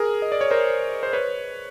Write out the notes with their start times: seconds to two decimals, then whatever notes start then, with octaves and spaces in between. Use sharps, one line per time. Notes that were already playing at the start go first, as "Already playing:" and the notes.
Already playing: G#4 A#4
0.22 D#5
0.32 D5
0.41 C#5
0.51 A#4 C5
1.03 C5
1.13 B4 C#5